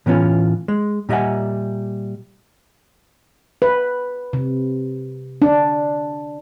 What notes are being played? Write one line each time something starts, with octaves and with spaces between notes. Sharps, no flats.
A2 E3 B3 C#4 F4
G#3
A#2 G3 D#5 E5 F#5 G#5
B4
C3
D4